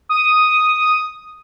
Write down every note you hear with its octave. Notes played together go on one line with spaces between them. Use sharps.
D#6